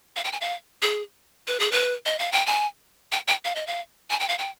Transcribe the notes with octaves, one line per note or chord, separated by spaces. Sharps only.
F5
G5
G#5
F5
G#4
B4
G#4
B4
D#5
F5
G5
G#5
G5
G5
F5
D#5
F5
G#5
G5
F5
G5